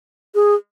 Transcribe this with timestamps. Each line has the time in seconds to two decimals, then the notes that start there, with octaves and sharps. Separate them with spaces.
0.35 G#4